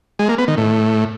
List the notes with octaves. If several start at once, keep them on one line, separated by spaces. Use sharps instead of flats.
G#3
A#3
B3
D#3
A2